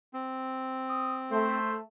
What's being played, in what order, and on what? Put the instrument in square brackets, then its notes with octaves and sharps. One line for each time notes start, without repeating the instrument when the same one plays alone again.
[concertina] C4
[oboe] D#6
[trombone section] A3 [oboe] C5